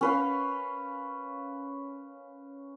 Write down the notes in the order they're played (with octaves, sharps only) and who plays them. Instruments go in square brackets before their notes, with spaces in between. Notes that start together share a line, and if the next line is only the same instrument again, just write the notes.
[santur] C#4 B4 F5